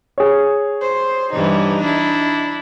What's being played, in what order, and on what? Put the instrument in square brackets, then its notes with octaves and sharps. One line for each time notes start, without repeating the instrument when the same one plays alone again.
[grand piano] G#4 C#5
[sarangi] C5
[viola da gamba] G2 E3 [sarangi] D#4
[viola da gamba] D4 E4